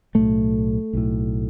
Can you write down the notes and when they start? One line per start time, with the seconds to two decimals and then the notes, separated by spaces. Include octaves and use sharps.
0.15 B1 A2 A3
0.93 B1 A2